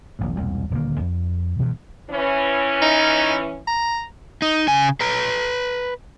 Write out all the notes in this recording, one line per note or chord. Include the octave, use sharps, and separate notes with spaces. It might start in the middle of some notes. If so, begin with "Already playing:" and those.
D#1 A#1 A2
E1 C2 A#2
D#1 D2 D3 A#3
F2
D2 G2 B2 E3
E3 C#4
D#4
A#5
D#4
C#3 G#5
B4 A#5